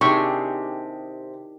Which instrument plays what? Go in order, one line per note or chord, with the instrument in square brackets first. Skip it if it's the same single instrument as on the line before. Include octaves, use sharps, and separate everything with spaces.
[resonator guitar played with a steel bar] C3 [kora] D#3 E4 G4 [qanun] D4 G#4 [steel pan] C#6